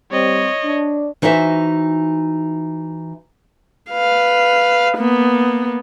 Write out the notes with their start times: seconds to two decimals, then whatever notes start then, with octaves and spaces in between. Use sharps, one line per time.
0.11 G3 C4 C#5 D#5
0.64 D4
1.22 E3 D#4 F#4 C5 E5
3.91 B4 F5
4.97 A#3 B3